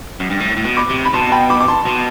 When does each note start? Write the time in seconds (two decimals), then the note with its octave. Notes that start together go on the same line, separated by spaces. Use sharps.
0.20 F#2
0.30 G2
0.40 A2
0.57 A2
0.64 B2
0.77 B5 D6
0.89 C3
1.05 B5
1.14 B2 A5 C6
1.27 A5
1.32 G5 B5
1.50 B5 D6
1.60 D6
1.68 A5 C6
1.86 B2